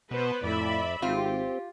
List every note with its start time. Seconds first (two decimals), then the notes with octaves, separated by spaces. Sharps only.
0.11 B2 B3 B4 C5
0.43 F2 A2 D5 E5 B5
1.02 G#1 C4 F4 G4